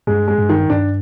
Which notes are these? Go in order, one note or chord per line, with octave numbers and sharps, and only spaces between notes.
G2 G#3
G#3
G2
D#3
G2 D4